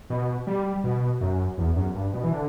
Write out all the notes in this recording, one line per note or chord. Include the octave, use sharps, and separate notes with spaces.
B2
G3
B2
F#2
E2
F#2
G2
B2
E3
D3